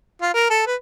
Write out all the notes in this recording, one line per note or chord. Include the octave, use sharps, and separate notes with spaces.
F4
A#4
A4
B4